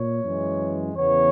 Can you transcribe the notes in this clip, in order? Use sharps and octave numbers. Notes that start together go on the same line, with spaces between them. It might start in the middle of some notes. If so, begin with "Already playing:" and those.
Already playing: A#2 C#5
F#2 E3 G#3
E2 C#3 E3 B3 C#5